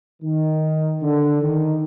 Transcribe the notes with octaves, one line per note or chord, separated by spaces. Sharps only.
D#3
D3
D#3